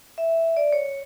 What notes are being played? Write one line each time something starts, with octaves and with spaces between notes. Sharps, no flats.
E5
D5
C#5